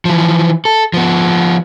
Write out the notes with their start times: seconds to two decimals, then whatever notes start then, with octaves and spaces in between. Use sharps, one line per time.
0.05 E3 F3
0.65 A4
0.93 F3 B3